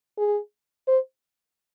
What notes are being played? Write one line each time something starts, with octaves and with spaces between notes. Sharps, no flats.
G#4
C5